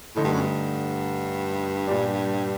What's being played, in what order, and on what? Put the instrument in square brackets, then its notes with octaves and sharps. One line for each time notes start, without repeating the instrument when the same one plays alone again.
[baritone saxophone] A2 [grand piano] D3 A3 D#4
[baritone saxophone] G2
F#2
G2
[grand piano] A#2 G3 D4